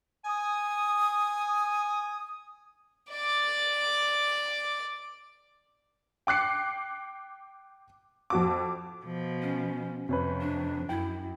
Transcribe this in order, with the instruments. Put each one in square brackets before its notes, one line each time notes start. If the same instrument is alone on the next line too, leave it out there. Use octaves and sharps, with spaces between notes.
[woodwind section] G#5 D#6
[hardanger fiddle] D5 D6
[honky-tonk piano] G5 D6 F#6 C7 C#7
F2 F#4 D6
[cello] B2 F3
[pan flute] C#4
[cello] F2 [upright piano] C3 C#4 B4
[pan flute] D4
[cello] F#2 [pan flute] E4 [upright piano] G5